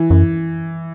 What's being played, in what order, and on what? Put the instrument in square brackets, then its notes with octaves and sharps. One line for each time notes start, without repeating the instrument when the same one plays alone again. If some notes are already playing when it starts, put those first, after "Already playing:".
Already playing: [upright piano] E3
[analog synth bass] F#2